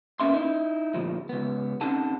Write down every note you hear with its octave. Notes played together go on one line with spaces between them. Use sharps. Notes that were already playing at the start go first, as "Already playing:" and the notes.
A#3 B3 C#4 E5 C6
D#4 E4
D2 A#2 F3
C#2 B3
C4 C#4 D#4 A4 F#5 A5